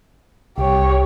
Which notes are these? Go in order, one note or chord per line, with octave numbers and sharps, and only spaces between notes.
C2 G4 C#5